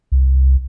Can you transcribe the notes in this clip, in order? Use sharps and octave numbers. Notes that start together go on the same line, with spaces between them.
C2